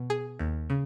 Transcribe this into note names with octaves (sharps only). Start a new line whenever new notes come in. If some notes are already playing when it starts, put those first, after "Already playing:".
Already playing: B2
G#4
D#2
C#3